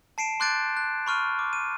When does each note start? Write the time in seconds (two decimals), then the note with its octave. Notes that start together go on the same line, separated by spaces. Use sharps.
0.18 A5 C7 D7 E7
0.40 C6 D6 F#6 G6 A6 D7
0.77 F#6
1.06 B5 C#6 F6 D#7
1.39 D6
1.53 D#7